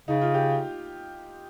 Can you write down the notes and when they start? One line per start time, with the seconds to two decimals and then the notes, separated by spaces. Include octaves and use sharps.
0.08 C#3 D#4
0.21 F4
0.34 G4